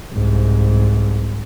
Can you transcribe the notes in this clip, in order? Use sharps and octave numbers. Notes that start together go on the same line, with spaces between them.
C2 G#2